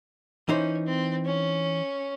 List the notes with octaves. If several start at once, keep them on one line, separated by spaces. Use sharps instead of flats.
E3 C#4 D#4 C5
C4
C#4